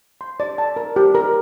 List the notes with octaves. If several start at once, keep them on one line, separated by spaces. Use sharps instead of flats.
C6
D5
A5
A#4
G4
A#4